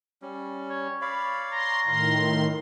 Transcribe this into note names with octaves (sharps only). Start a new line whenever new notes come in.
G3 C#4
C#5
C#5 D5 F5 B5
A#5 C6
A2 D#3 F5 C6